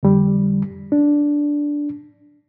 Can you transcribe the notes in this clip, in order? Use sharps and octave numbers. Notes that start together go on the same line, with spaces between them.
F2 D3 G3
D4